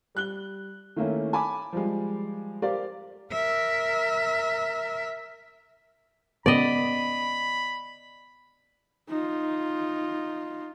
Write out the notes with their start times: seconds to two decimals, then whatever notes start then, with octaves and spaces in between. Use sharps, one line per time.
0.15 G3 F#6 G7
0.96 D#3 A3 A#3 C#4 E4
1.33 G#5 A5 B5 D6
1.73 F3 G3 G#3
2.62 G4 A#4 C5 D5 F5
3.32 A#4 E5
6.46 C#3 B3 D5 D#5 B5
9.09 D#4 F4